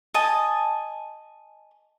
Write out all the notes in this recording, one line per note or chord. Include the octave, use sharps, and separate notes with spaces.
D#5 G#5 A5